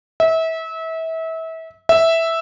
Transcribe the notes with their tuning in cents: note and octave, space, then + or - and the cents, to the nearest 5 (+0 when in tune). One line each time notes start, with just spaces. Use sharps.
E5 -30
E5 -5